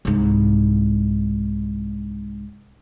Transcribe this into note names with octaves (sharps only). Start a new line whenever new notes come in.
C2 G#2